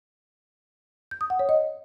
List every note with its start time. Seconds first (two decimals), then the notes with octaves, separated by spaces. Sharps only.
1.11 G6
1.21 D#6
1.30 F#5
1.39 C#5
1.49 D#5